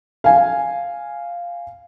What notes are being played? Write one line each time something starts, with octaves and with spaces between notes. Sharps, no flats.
F5 G#5